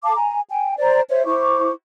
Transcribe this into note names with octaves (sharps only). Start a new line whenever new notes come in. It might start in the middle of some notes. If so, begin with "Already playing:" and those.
A4 F5 A5 D6
G#5 A#5
G5 G#5
C5 D5 A#5
C5 C#5 E5
E4 C5 C#6 D6